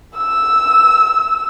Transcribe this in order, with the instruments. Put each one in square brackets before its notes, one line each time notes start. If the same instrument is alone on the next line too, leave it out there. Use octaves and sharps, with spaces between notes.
[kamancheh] E6